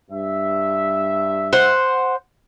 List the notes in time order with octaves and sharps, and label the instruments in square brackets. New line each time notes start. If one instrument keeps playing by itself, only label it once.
[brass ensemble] G2 E5
[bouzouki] C5 F#5